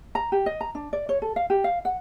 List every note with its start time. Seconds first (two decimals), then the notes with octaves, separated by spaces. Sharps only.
0.15 A#5
0.32 G4
0.46 D#5
0.61 A#5
0.75 D4
0.93 D5
1.09 C#5
1.22 A4
1.36 F5
1.50 G4
1.64 F5
1.85 F#5